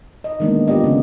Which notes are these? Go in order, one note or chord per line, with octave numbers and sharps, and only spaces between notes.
D#5
D#3 E3 G#3 A#3 B3 D4
B3 F4 G4 D5 D#5
C#3 E4 F4 G#4